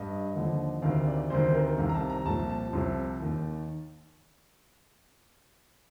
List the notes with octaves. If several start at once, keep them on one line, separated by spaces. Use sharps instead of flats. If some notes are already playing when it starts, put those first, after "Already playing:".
Already playing: G2 D#5
D#2 D3 F3
D2 C3 D#3 F5
D5
D2 C3 D#3 C5
A#4
C2 C3 D#3 F5
A#5
A5
A#5
C2 A#2 F3 A5
A5
C2 C3 F3
D#2 D#3